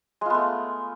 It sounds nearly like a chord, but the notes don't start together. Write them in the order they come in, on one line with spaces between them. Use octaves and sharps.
G#3 F4 B3 A3